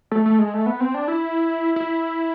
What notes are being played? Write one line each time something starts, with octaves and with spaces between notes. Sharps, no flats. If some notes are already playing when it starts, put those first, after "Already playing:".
A3
A3
G#3
A3
B3
C4
D4
E4
E4